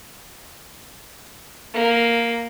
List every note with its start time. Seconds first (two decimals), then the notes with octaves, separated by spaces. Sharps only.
1.74 A#3